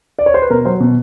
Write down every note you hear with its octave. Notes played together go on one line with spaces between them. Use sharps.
D5
C#5
C5
B4
B2 A#4
F#3 C5
B2